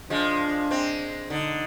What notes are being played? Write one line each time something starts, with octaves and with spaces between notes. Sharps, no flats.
F3 G#3 D4
G#3 C4
D3 D#4